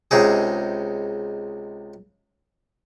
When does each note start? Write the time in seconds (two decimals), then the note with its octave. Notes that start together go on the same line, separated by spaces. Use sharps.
0.11 C#2 C3 D#4 G#4